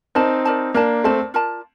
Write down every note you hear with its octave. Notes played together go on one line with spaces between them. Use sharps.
C4 D#4 A#4 D5 A5
A#4 D5 A5
A#3 D4 A#4 D5 A5
A3 C4 A#4 D5 A5
F4 A#4 D5 A5